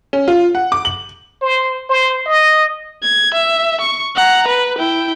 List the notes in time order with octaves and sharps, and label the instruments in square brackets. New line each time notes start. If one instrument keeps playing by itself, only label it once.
[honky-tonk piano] C#4
F4
F#5
D6
F#7
[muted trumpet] C5
C5
D#5
[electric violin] G#6
E5
C#6
F#5 A#5
B4
E4 G5